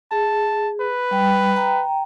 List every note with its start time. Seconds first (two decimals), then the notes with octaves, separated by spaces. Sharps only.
0.12 G#4 A5
0.80 B4
1.11 G3 G5
1.56 G5 A#5